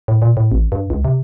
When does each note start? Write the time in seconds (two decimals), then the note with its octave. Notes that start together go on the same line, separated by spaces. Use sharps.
0.08 A2
0.22 A#2
0.37 A2
0.52 A1
0.72 G2
0.90 C#2
1.05 C3